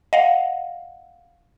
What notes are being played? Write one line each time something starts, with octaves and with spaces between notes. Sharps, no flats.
D#5 F5 F#5